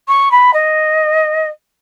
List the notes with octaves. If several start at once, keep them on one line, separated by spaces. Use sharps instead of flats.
C#6
B5
D#5